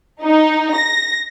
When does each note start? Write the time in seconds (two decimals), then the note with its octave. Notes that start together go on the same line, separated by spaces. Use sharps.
0.23 D#4
0.75 A#6